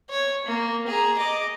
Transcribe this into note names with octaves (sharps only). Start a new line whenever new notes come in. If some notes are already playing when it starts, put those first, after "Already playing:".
C#5
A#3
G#4 A#5
D#5 D6